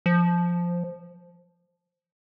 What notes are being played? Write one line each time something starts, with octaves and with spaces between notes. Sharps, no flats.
F3